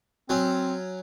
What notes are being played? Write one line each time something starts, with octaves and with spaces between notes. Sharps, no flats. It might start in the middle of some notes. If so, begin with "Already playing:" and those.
F#3 C4 C#4